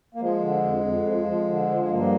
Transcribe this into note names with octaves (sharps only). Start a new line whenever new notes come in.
A#3
F3 G#3
D3
F2
F2
F3
F3
D3
F3
G#3
G2 A#3